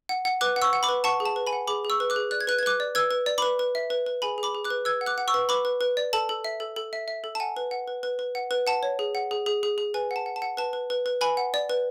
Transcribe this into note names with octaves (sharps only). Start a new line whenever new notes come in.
F#5
F#5
B4 D6 F#6
F#5
C#6 E6
F#5
B5 D6
B4
F#5 A5 C#6
G#4
A5
B4
G#5 B5
F#5
G#4 B5 D6
G#4
C#6 E6
B4
D6 F#6
G#4
D5 F#6
G#6
B4 F#6
G#6
B4 D6 F#6
D5
B4 E6 G#6
B4
D5
B5 D6
B4
B4
E5
B4
B4
G#4 G#5 B5
G#4
B5 D6
G#4
D6 F#6
B4
B4 E6 G#6
F#5
D6 F#6
F#5
C#6 E6
B4
B4 B5 D6
B4
B4
D5
A4 A5
A4
E5
A4
A4
E5
E5
A4
A5
F#5 G#5
B4
F#5
B4
B4
B4
F#5
B4
F#5 A5
C#5
G#4
F#5
G#4
G#4
G#4
G#4
B4 G#5
F#5
A5
F#5
A5
F#5
B4 A5
B4
B4
B4
B4 G#5 B5
F#5
D5
B4